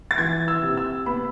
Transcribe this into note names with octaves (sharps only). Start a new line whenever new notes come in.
A6
E3 G#6
E6
C3
E6
B3 B5